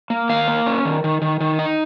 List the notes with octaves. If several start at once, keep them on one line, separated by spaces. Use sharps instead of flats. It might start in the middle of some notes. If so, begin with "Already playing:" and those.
A#3
D#3 F5
A#3
C#4
D#3
D#3
D#3
D#3
D#4